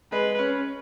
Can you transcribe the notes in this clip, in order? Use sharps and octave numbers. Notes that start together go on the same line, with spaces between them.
G#3 B4
C#4